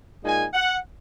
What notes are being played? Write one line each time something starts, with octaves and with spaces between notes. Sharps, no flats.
A#2 G#3 D#4 G#5
F#5